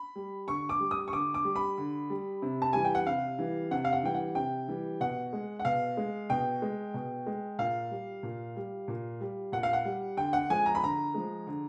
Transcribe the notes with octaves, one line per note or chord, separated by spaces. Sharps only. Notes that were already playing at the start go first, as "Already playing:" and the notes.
Already playing: B5
G3
D3 C#6
D6
G3
D#6
C#6
D3 D6
D6
G3
B5
D3
G3
C3
A5
E3 G3 G#5
G5
F#5
C3 F5
E3 G3
C3 F#5
F5
F#5
E3 G3 G5
F#5
C3 G5
E3 G3
B2 F#5
G#3
F#5
B2 F5
G#3
B2 G5
G#3
B2
G#3
A#2 F5
G3
A#2
G3
A#2
G3
A#2 F#5
F5
F#5
G3
D3 G5
F#5
F3 G#3 G#5
A#5
B5
D3 A#5
F3 G#3
D3